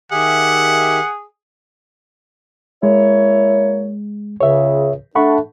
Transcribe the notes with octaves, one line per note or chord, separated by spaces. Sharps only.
D#3 G4 G#4 E5 F#5
G#3 A#3 E4 C#5
C#2 C#3 C#5 E5
A3 D4 F#5 B5 C#6